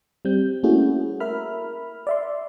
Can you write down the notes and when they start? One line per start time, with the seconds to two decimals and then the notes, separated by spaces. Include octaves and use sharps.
0.25 G3 C4 G6
0.63 A3 A#3 C#4 E4 F#4 G#4
1.20 A#4 E5 B5 F6
2.07 D5 E5 C6